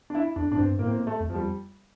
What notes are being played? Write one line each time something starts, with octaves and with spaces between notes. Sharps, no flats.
D4
E4
F2 D4
A2 D4
G2 C4
A2 A#3
C4
A#3
A3
F2
F3
G3